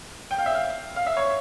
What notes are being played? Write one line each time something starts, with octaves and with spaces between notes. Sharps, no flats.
G5
F5
E5
F5
F5
E5
C#5